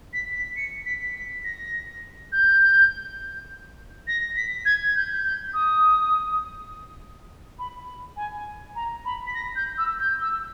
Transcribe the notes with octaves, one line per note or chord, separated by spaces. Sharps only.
B6
B6
C#7
B6
B6
A#6
G6
A#6
B6
G#6
G6
G6
D#6
B5
G#5
A#5
B5
B6
A#6
G6
E6
G6
E6